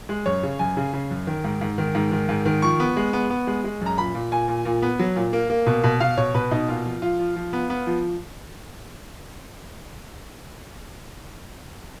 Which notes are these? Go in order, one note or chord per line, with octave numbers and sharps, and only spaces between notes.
G#3
F#2 C#5
C#3
F#2 G#5
C#3
C#3
F#2
D#3
G#2
G#2
D#3
G#2
D#3
G#2
D#3
F3 C#6
B3
G#3
B3
B3
G#3
G#3
F#2 A#5
A#2 B5
A#2
A#2 G#5
A#2
A#2
B3
F#3
A#2
A#3
A#3
B2
B2
B2 F5
B2 C#5
B2 B4
B2 D#4
A#2 F4
F3
F3 F4
F3
F3
B3
B3
F3